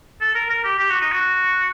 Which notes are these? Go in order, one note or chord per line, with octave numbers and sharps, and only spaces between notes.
A4
A#4
A#4
G4
G4
F#4
D#4
F#4